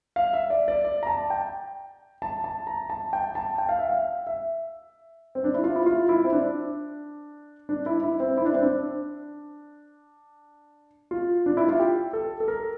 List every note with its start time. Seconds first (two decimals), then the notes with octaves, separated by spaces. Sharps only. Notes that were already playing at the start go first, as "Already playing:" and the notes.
0.16 F5
0.33 E5
0.50 D5
0.68 D5
0.85 D5
1.03 A#5
1.07 A5
1.30 G5
2.22 A5
2.44 A5
2.67 A#5
2.90 A5
3.13 G5
3.35 A5
3.58 G5
3.69 F5
3.79 E5
3.89 F5
4.27 E5
5.35 C4
5.44 D4
5.54 E4
5.64 F4
5.76 E4
5.86 F4
6.09 E4
6.24 C4
6.32 D4
7.69 D4
7.86 E4
8.03 E4
8.20 C4
8.37 E4
8.45 D4
8.54 C4
8.62 D4
11.11 F4
11.46 D4
11.57 E4
11.69 F4
11.79 G4
12.13 A4
12.40 A4
12.48 A#4